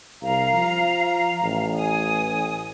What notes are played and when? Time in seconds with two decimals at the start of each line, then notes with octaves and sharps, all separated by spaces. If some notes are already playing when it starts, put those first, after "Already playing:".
0.22 C2 F5 A#5
0.54 F3
1.42 A1
1.74 G#5 D#6